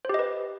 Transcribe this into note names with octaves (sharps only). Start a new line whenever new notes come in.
G4 B4 C5 D#5